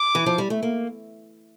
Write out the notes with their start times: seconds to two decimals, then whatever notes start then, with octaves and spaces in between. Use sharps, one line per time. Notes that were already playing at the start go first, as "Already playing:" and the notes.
Already playing: D6
0.15 E3
0.26 F3
0.38 G3
0.50 A3
0.63 A#3